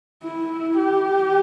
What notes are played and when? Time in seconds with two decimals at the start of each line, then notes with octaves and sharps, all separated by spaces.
0.24 E4
0.78 G4